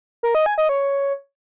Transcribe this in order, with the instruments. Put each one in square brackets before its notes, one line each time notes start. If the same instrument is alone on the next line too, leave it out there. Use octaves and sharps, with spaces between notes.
[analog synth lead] A#4
D#5
G#5
D#5
C#5